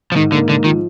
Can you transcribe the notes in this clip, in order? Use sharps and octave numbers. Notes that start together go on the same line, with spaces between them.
F3
G#2 D#3
D3 A#3
G#2 D3
D#3 F3